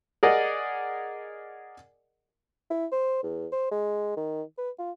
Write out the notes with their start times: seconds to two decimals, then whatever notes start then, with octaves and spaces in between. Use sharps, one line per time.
0.23 G#4 A#4 D5 D#5 F#5
2.70 E4
2.92 C5
3.23 E2
3.52 C5
3.71 G#3
4.17 D#3
4.58 B4
4.79 F4